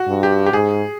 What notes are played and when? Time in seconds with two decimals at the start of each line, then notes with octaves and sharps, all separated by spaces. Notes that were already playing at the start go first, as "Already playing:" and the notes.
Already playing: F#4
0.08 G2
0.23 G4
0.46 G4
0.53 G#2 G#4